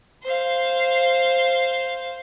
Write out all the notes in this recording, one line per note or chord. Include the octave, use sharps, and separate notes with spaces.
C5 F5